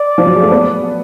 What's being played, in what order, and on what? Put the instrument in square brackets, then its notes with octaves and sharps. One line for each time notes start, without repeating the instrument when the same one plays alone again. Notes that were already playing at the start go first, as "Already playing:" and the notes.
Already playing: [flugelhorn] D5
[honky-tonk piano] F3
F#3
G#3
A3
B3